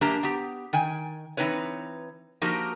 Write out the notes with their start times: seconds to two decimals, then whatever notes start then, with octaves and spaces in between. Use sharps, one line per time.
0.01 F#2 A#3 D4 G4 A5 A#5
0.23 B3 G4
0.73 D#3 G5 G#5
1.37 E3 F#3 C4 D#4 B4 C#5
2.42 F3 A#3 D#4 F#4 G4 A#4